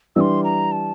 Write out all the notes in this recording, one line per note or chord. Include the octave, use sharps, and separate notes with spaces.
E3 G3 D4 C6 E6
A#5
A5